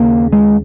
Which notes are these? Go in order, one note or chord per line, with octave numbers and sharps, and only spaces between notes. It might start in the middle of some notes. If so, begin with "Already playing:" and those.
Already playing: D#2 C#3 A#3
G#3